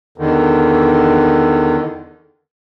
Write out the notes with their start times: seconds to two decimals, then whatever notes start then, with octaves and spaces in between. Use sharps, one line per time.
0.18 E2 D3 D#3